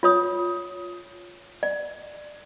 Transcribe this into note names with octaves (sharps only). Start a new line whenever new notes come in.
F4 C#5 D#6
D5